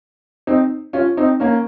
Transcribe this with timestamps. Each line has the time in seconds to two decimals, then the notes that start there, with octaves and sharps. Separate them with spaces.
0.47 C4 D#4
0.93 C#4 F4
1.17 C4 D#4
1.40 A#3 C#4